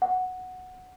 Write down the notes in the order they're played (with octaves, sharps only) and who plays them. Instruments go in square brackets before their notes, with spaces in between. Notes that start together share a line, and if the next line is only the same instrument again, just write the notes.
[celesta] F#5